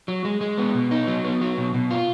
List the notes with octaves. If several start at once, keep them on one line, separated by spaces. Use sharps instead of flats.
F#3
G#3
G#3
B3
B2
D#4
F#3
B3
F#3
B2
B2
F4